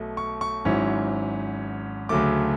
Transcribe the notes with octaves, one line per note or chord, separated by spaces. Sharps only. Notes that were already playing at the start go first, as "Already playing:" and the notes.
Already playing: B1 B2 A3
C#6
C#6
G#1 G#2 F#3 C#4 E4
D2 C#3 F#3 A3 D6